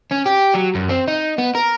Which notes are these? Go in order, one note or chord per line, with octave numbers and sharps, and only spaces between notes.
C#4
G4
F#3
F#2
C4
D#4
B3
A#4